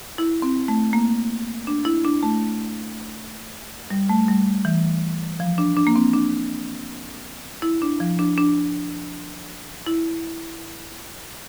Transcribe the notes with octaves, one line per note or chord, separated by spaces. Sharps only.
E4
C4
A3
A#3
D4
E4
D4
A3
G3
A3
G3
E3
F3
D4
D4
A#3
C4
D4
E4
D4
F3
D4
D4
E4